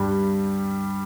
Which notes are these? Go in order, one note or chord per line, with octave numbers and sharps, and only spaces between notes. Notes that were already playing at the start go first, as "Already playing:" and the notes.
Already playing: G2 G3